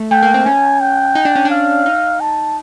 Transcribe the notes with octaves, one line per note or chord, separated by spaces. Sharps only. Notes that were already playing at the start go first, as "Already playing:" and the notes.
Already playing: A3
A3 G5
A#3
C4
C#4 G#5
G5
D#4
D4
C#4
D4
F5
D#4
A5